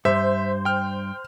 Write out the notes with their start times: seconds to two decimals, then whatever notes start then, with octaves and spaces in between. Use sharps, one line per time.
0.05 G2 C5 E5
0.65 G5 F6